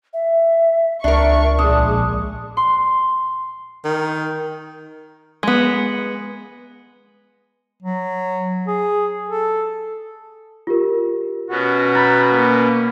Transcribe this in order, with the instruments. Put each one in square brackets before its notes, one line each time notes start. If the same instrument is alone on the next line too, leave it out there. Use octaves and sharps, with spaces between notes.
[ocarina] E5
[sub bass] C#2 [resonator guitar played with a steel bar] D4 A#4 [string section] D5 C#6 [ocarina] E5
[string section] A#1 G#3 [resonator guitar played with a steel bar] D4 [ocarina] D#6
[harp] C6
[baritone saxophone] D#3
[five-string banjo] G#3 B3
[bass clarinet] F#3
G#4
A4
[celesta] F4 G4 A#4
[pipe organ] B2 B3 C#4 [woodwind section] F#4
[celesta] A#5 G6 A6 [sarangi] B5
[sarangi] A#3